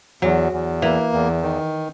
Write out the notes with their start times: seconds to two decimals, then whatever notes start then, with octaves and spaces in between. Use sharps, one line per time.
0.22 E2 F#3
0.52 E2
0.82 E3 A#3
1.13 E2
1.43 D#3